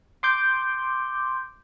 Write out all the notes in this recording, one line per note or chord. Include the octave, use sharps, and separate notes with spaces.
C6 D6 G6